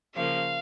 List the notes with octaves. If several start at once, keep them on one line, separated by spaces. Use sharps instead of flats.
C#3 F3 A#3 F5